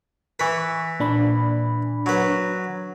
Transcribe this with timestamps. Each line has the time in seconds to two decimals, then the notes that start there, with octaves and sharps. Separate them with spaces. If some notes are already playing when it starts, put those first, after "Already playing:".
0.39 E3 B4 C#6 B6
1.00 A#2 D4 B5
2.06 F#3 B4